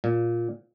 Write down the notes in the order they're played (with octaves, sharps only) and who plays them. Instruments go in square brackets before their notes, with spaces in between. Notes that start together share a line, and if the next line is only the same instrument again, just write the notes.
[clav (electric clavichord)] A#2